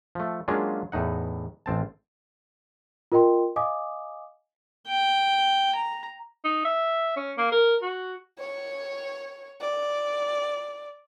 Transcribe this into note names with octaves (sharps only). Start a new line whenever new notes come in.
F3 A3
F#3 G#3 A#3 C#4 D4 F4
E2 A2 D#4 F#5
A1 C4 A5
F4 A#4 D#5 G5 C6
D#5 F5 G#5 D6 D#6
G5
A#5
D#4
E5
C#4
A#3
A#4
F#4
C#5
D5